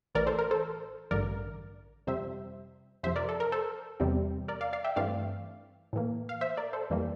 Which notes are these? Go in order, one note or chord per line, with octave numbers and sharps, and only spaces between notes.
A1 A2 E3 A#4 D5
A4 C5
A#4
A4 C5
A1 G2 D3 A#4 D5
F2 C3 G3 C5 E5
F2 C3 F3 C5 E5
A#4 D5
A4
A#4
A4 C5
E2 C3 G3 C4
A#4 D5
D5 F5
D5 F5
E5 G5
G2 E3 A3 C4 D5 F5
A2 E3 A#3
F5
C5 E5
A#4 D5
A4 C5
F2 E3 G3 A#3